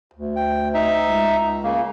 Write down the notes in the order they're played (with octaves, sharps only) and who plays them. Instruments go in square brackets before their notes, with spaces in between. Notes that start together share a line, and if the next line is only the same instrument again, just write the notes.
[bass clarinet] D2
[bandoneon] G5
D#4 E5
[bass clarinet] C#2
[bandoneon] C#3 A#3